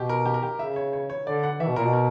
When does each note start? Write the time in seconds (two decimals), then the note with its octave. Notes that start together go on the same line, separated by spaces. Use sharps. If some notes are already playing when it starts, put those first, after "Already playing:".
Already playing: B2 G4
0.09 A#4
0.26 G4
0.34 A#4
0.43 G4
0.59 C#3 E5
0.76 C#5
0.93 C#5
1.10 C#5
1.26 D3 D5
1.43 F#5
1.60 E3 E5
1.68 B2
1.76 A#2 A#4
1.85 B2
1.93 A#4